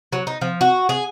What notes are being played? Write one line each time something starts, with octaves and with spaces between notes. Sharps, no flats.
F#3
D#4
F3
F#4
G#4